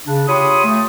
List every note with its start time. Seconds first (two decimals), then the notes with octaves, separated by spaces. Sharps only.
0.06 C#3 D4
0.28 F4 G4 C#5 B5 C6 D#6
0.65 A3